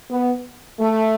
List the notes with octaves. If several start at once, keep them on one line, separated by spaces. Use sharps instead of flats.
B3
A3